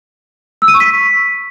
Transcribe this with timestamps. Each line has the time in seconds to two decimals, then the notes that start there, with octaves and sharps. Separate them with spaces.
0.62 E6
0.68 D#7
0.74 C#6
0.80 B6